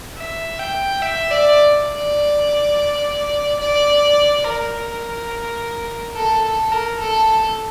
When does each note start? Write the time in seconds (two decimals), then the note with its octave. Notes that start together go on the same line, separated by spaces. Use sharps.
0.17 E5
0.59 G5
1.02 E5
1.30 D5
1.88 D5
3.59 D5
4.44 A#4
6.15 A4
6.43 A4
6.72 A#4
6.99 A4